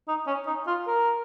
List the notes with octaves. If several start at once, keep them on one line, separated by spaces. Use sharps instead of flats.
D#4
C#4
D#4
F4
A#4